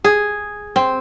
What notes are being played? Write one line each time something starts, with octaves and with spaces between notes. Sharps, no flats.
G#4
C4